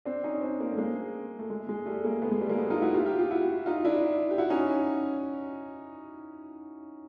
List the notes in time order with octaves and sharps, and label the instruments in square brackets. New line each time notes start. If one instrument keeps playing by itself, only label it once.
[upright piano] C4 D4
C#4 D#4
C4 D4
A#3 C4
A3
G#3 A#3
A3
G#3
G#3
G3 A3
G#3 A#3
A3 B3
G#3
G3 A3
G#3 A#3
A3 B3
D#4 F4
E4 F#4
F4 G4
F4 G4
F4 G4
E4 F#4
D#4 F4
D4 E4
G4
E4 F#4
C#4 D#4